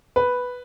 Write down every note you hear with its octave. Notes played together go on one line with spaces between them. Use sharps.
B4